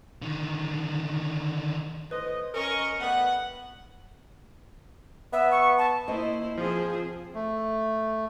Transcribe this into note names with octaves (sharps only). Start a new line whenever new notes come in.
D3 D#3
A2 B4 C5 D#5
C#4 A#4 D#5 C#6
G3 A3 B3 F#5
B3 E5
C#6
A5
A#3 E4 C5 D#5
F3 C4 G#4 C5
A3